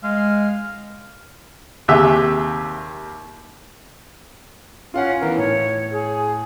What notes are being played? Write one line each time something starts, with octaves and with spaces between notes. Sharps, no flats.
G#3 F5
D#2 C3 G4 G#4 E5 E6
C#4 F4 F5 F#5
E3 B3 A#4
A2 C#5
G#4